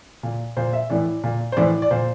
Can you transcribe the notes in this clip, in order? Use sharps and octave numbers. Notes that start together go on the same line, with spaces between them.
A#2
A#2 C5
E5
A2 E3 D5
A#2
C5
A2 E3 D5
D5
A#2 C5